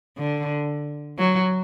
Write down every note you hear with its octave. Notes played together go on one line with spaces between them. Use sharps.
D3
F#3